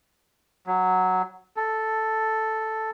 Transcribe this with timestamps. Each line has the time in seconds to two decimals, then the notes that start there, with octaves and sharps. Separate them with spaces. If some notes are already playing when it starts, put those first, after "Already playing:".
0.67 F#3
1.57 A4